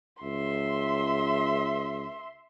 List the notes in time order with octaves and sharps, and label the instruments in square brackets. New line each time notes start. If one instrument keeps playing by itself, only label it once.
[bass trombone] C#2 [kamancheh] E5 C6